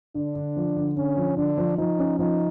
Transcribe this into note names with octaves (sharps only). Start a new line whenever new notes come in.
D3 D4
D3
F3
D3
D3 C#4
F3
D3 D4
F3
F3 D#4
C#4
F3 D#4